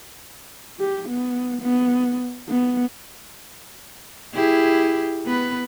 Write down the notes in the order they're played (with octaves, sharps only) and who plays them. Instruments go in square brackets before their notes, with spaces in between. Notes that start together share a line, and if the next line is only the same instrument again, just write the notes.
[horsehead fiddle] G4
B3
B3
B3
[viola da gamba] E4 G4 G#4
B3 B4